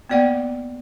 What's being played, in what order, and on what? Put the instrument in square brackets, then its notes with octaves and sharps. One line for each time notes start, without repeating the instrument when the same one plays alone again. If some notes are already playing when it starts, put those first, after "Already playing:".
[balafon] A#3 B3 D5 F#5 G5